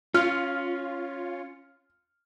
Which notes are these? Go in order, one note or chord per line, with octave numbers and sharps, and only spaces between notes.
C#4 F4 F6